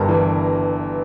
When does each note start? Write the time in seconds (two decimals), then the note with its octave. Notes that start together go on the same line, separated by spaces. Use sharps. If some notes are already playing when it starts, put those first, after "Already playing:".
Already playing: G1 G2 A#4
0.09 E3